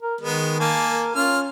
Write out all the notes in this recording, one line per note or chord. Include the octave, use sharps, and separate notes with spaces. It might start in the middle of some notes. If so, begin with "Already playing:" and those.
A#4
D#3 G#3 B3
A#3 G#5 A5
A#4
C#4 F4 F6